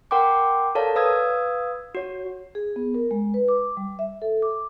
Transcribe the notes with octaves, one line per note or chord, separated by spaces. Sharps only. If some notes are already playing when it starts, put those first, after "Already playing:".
A#4 F#5 G5 C6 D6
A4 A#4 C#5 D5 F5 A5
B4 F5 D#6 E6 G#6
F#4 C#5
G#4
B3
A#4
G#3
B4
D6
G3
E5
A4
D6